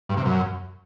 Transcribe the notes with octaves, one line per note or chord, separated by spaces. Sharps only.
G2
C3
F#2